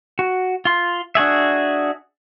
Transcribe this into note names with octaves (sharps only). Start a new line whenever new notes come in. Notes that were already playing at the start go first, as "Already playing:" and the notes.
F#4
F4 C6
D4 F#4 G#4 E5